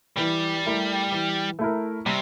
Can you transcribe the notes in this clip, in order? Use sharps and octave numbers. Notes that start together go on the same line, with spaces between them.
E3 G3
A3 E4 A#4
E3
A3 E4 A#4
C3 G3